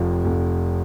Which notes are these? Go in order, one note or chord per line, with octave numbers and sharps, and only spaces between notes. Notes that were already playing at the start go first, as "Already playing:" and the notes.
Already playing: F1 F2 F3
F1